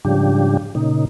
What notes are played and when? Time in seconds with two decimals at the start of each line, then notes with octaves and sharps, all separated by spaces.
0.05 G#2 C#3 F3 G3 D4 G4
0.75 A#2 C#3 D#4